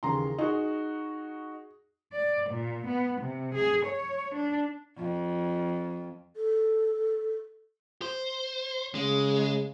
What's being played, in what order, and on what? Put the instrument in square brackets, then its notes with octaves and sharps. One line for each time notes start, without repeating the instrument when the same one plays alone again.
[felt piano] D#2 C#3 E3 [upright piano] G#4 A#5 C6
[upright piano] D#4 F#4 [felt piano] G#4
[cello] D5
A#2
B3
C3
G#4
C#5
D4
[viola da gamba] F2
[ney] A4
[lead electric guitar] C5
[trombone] C#3 [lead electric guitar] G#3